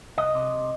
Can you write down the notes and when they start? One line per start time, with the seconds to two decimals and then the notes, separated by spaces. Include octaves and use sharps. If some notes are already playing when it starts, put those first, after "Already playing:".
0.18 C2 D#5
0.35 C3